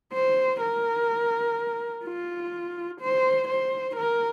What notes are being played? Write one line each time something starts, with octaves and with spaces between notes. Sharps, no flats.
C5
A#4
F4
C5
C5
A#4